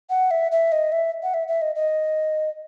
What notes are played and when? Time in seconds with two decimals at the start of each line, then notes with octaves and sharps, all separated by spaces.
0.10 F#5
0.31 E5
0.52 E5
0.72 D#5
0.92 E5
1.23 F#5
1.34 E5
1.48 E5
1.62 D#5
1.75 D#5